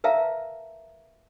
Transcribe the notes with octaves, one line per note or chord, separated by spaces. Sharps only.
A#4 B4 E5 F5 A5 A#5